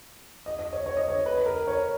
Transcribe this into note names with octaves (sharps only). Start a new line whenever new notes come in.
D#5
D#5
C#5
C#5
D#5
C#5
B4
A#4
C#5